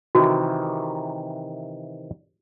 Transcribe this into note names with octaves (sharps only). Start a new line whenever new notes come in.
C3 D#3 E3 F#4